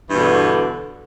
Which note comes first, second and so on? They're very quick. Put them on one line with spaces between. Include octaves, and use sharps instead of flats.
E3 G2 B2 D3